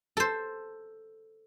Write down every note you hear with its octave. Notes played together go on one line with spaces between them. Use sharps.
A4 C5